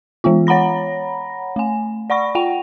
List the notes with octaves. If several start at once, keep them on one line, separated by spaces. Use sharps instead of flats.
E3 G#3 B3 F4
C#5 F#5 A#5 B5 A#6
A3 G#5
D5 F#5 B5 C#6 A#6
F4 F#5 G5 F7